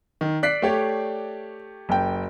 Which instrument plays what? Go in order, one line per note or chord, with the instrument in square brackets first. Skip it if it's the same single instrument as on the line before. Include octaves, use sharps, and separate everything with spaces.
[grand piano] D#3
[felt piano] D5 [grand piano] F#6 B6 C7
[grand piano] A3 G4 C#5
[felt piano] F#1 G5